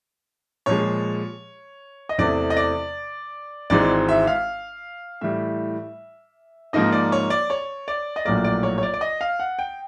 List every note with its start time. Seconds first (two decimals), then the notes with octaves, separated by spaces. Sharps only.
0.66 A#2 F3 G#3 C#5
2.09 D#5
2.18 E2 C3 E3 A3 C4 D5
2.50 D#5
2.57 D5
3.70 G#1 G#2 E3 G#3 C4 D5
4.09 E5
4.27 F5
5.21 A2 E3 G3 E5
6.73 G#2 F3 A#3 D#4 D#5
6.92 D5
7.12 C#5
7.30 D5
7.50 C#5
7.88 D5
8.16 D#5
8.25 A#1 A2 F#3 A#3 D5
8.44 D5
8.63 C#5
8.78 C#5
8.83 D5
8.94 D5
9.01 D#5
9.21 F5
9.40 F#5
9.59 G5